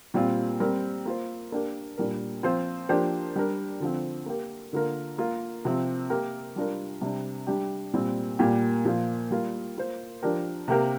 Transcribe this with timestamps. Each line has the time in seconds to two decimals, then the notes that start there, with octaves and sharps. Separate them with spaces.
0.14 A#2 G3 C4 F4
0.60 G3 C4 A#4
1.05 A#3 F4 C5
1.52 A#3 D4 G4 A#4
1.98 A#2 G3 D4 A#4
2.43 F3 C4 F4 C5
2.89 F3 A#3 D4 G4 C5
3.36 G3 D4 A#4
3.80 D3 F3 C4
4.26 A#3 G4 A#4
4.73 D3 A#3 F4 A#4
5.18 A#3 F4 A#4
5.65 C3 F3 C4
6.10 A#3 G4 A#4
6.56 G3 D4 F4 A#4
7.01 C3 G3 D4
7.47 G3 D4 G4
7.94 A#2 G3 C4
8.39 A#2 G3 A#3 G4
8.85 A#2 F3 A#3 F4
9.31 G3 A#3 F4 A#4
9.77 A#3 F4 C5
10.23 F3 D4 G4 A#4
10.68 C3 A#3 G4 A#4